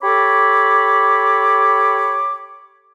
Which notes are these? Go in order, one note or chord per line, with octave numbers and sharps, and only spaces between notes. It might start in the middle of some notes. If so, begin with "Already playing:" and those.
G4 A4 C#5 B5 D6